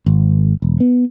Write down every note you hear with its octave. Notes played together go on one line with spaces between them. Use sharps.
G#1
E1
B3